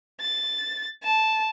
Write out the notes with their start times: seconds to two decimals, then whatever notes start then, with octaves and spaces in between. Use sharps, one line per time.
0.21 A6
1.03 A5